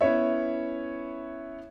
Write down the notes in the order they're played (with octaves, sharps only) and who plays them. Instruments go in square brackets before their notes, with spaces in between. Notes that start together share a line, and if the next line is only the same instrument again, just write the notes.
[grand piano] B3 C#4 E4 C#5 E5